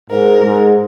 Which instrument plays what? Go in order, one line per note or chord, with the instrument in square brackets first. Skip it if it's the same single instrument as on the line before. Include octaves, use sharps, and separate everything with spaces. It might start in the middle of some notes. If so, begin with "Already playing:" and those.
[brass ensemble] G#2 [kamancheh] A#4
[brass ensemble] G#2